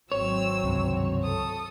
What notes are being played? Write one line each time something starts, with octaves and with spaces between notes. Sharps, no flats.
G#1 F#3 C4 C#5 E6
C#2 G2 C3
A4 D#6